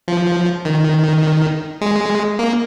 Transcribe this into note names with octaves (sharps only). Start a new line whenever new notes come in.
F3
D#3
G#3
A#3